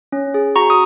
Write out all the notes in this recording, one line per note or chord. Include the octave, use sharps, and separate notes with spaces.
C#4
G#4
F#4 A#5 C#6
D#6